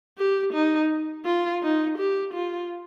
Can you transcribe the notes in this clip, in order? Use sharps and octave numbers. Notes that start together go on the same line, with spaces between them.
G4
D#4
F4
D#4
G4
F4